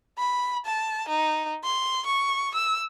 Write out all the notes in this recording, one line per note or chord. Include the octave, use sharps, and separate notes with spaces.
B5
A5
D#4
C6
C#6
E6